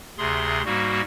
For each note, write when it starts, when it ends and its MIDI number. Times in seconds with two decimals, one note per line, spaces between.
0.18 0.62 38
0.18 0.62 48
0.18 0.62 68
0.18 0.62 84
0.65 1.01 44
0.65 1.01 55
0.65 1.01 58
0.65 1.01 66